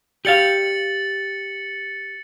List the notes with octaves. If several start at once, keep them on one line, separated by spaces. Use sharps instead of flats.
G4 D5 F5 A6 C#7 F#7